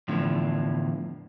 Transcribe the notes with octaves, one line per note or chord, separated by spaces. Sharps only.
E2 A2 D3 F3